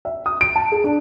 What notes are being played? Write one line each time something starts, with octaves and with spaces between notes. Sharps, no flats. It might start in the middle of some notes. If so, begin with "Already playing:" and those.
E5
D#6
D7
A5
G#4
D4